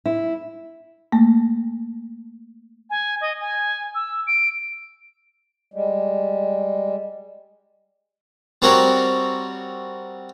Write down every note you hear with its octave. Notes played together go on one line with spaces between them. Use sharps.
E4
A3 A#3
G#5
D#5
G#5
E6
D7
G3 G#3
G3 C4 F#4 A#4 C#5